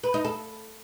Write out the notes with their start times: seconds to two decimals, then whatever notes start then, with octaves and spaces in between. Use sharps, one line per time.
0.03 B4
0.14 D#4
0.25 A4